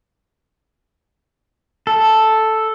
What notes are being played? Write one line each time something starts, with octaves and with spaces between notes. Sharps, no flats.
A4